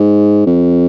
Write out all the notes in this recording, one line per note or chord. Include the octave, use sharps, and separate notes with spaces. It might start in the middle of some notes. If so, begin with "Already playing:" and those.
Already playing: G#2
F2